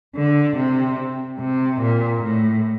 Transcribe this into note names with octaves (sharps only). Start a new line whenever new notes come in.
D3
C3
C3
A#2
A2